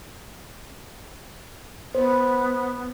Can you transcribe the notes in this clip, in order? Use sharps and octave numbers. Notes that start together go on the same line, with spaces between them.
B3 C5